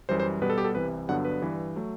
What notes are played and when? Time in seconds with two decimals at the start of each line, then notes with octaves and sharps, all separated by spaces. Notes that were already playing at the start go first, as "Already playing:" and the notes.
0.09 F#2 E3 G3 C5
0.20 C5
0.42 B2 G3 B3 B4
0.50 A4
0.58 G4
0.64 A4
0.75 C2 C3 E3 B4
1.09 G2 D3 F#3 B3 F#5
1.25 B4
1.42 G2 E3 G3
1.76 F#3 A3